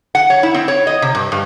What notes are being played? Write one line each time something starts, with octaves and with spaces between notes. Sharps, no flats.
F#5
C#5
E4
C4
C#5
D#5
C3
G2
G2